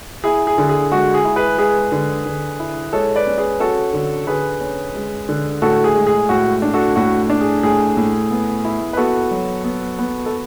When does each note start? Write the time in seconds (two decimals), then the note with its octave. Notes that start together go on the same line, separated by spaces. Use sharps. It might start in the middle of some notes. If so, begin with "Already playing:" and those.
0.24 E4 G#4
0.47 G#4
0.58 D3
0.69 G#4
0.91 G#3 F#4
1.14 G#4
1.25 E4
1.36 G#4 B4
1.58 G#3 G#4 B4
1.92 D3
2.26 D3
2.60 E4
2.93 G#3 A4 C#5
3.16 B4 D5
3.27 C#4
3.38 G#4 B4
3.60 C#4 F#4 A4
3.93 D3
4.27 D3 G#4 B4
4.61 C#4
4.95 G#3
5.29 D3
5.62 A2 F#4 A4
5.84 G#4
5.95 G#3
6.07 G#4
6.29 A2 F#4
6.62 D4
6.74 F#4 A4
6.96 A2 F#4
7.30 D4
7.41 G#4
7.63 A2 G#4
7.97 A2
8.30 B3
8.65 E4
8.93 B4
8.97 B3 F#4 A4
9.31 F#3
9.64 B3
9.99 B3
10.26 A4